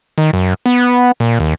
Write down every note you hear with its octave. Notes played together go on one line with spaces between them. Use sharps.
D#3
F#2
B3
A#2
D#2